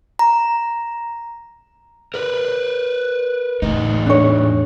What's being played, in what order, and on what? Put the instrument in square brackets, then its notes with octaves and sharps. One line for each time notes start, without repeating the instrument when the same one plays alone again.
[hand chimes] A#5
[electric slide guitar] A#4 B4
[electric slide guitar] E2 D#4 [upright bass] A2
[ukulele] D4 C#5